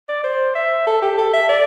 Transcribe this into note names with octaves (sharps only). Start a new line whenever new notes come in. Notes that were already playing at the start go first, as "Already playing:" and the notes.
D5
C5
E5
A4
G4
A4
E5
D5